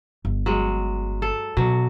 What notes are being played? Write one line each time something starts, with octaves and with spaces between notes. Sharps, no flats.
G1
F#3 G#3
A4
B2 F#3